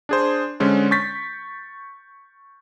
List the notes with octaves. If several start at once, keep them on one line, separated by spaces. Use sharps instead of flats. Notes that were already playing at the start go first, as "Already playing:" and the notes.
D4 G#4 C5
D3 G#3 C#4 C5
C#6 G6 A6 B6